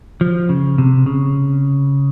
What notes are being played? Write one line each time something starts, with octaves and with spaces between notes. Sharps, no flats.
F3
C#3
C3
C#3